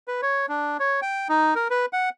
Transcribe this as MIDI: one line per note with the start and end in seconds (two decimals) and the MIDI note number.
0.08 0.21 71
0.22 0.46 73
0.49 0.77 62
0.80 1.00 73
1.02 1.28 79
1.29 1.54 63
1.55 1.68 70
1.70 1.86 71
1.93 2.09 78